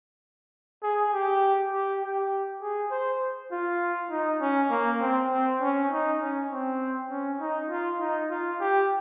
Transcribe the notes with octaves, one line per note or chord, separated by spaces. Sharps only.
G#4
G4
G4
G4
G#4
C5
F4
D#4
C#4
A#3
C4
C4
C#4
D#4
C#4
C4
C#4
D#4
F4
D#4
F4
G4